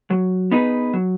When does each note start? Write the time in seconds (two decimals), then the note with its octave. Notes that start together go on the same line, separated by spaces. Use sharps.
0.10 F#3
0.51 B3 D#4 G#4 B4
0.94 F#3